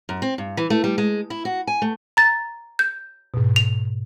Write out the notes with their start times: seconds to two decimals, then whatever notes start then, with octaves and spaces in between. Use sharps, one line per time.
0.09 F#2
0.22 C4
0.38 G2
0.57 E3
0.70 A3
0.84 G3
0.98 G#3
1.30 E4
1.45 F#4
1.67 G#5
1.82 A3
2.17 A#5 A6
2.79 G6
3.34 G#2 B2
3.56 F7